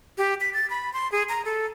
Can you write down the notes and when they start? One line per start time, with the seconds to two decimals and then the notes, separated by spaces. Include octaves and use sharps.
0.18 G4
0.41 B6
0.54 A6
0.70 B5
0.93 C6
1.12 G#4
1.29 A#5
1.45 A4